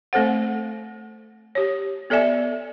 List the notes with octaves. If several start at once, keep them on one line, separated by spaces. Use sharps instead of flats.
A3 C4 A4 C5 F#5
G4 C#5
B3 A4 D5 E5 G#5